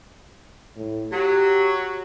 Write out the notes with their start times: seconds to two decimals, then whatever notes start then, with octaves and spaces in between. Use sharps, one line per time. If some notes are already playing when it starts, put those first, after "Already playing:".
0.76 A2
1.12 F#3 G4